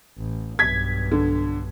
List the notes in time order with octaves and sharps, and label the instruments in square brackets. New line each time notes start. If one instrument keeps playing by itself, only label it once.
[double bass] A1
[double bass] B1 G2 [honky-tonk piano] G#6 B6
[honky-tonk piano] D3